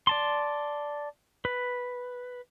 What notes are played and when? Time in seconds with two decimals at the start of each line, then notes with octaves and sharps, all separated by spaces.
0.07 D5 A5 C6
1.45 B4